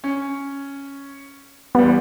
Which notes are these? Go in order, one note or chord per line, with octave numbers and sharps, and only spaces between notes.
C#4
E2 G3 B3